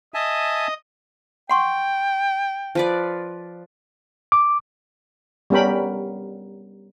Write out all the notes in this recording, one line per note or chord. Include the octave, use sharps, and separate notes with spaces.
D#5 E5 G#5 A5
F#5 G5 C6 C#6
F3 B4 D5
D6
G3 B3 C#4 A#4 G5 B5